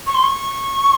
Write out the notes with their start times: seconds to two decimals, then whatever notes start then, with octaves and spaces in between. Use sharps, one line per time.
0.07 C#6
0.14 C6
0.23 C#6